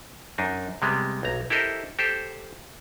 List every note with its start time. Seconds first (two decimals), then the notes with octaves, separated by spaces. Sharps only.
0.38 F#2 D4 D#4
0.82 C3 G3 G#3 B3
1.23 B1 A#5
1.50 E4 G4 A4 A#4 C5 D#5
1.99 G4 A4 C5